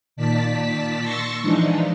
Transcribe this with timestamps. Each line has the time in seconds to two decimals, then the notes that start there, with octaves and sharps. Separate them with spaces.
0.16 A#2 D#3 D5 A5 B6
1.01 C6 C#6 E6 A6 A#6 C#7
1.40 E3 F3 G#3 D4 D#4